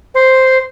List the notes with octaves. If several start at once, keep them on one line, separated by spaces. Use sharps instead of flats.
C5